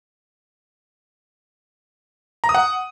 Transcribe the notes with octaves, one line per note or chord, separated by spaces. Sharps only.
A#5
D#6
F#5